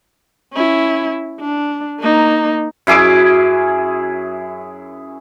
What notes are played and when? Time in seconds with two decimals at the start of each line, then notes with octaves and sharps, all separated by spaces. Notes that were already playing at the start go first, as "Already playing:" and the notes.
0.53 C#4 E4
1.41 D4
2.00 A#3 D#4
2.87 F#2 E4 G#4 D6